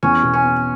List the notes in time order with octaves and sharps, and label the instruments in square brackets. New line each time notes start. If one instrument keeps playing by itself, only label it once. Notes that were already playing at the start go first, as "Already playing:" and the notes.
[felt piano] E2 [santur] C#4
[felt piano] B2
[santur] C#4
[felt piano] B3